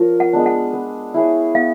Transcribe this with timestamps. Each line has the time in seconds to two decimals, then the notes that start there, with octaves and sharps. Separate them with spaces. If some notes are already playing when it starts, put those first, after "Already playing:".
Already playing: F3 F4 A#4 C#5
0.20 F#5
0.33 G#3 B3 D4
0.46 F#5
0.73 B3
1.14 E4 G#4 C#5
1.54 B3 F5